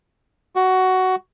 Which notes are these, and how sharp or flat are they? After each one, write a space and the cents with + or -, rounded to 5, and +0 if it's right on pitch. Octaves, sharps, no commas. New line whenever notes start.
F#4 +10